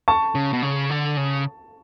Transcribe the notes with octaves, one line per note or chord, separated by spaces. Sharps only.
A5 C#6
C#3
B2
C#3
D3
C#3